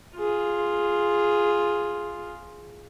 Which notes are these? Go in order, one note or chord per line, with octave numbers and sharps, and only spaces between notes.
F4 G#4